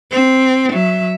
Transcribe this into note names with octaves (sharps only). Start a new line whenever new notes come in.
C4
F#3 E5